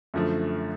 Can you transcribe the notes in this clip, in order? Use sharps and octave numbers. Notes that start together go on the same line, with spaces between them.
F#2 D3 F3 A3